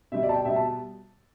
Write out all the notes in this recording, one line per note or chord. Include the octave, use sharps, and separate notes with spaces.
B2 G3 E5
D5
A5
G5
B2 G3 E5
A5